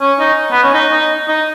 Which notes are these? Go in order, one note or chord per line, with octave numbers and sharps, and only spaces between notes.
C#4
D#4
B3
C#4
D#4
D#4
D#4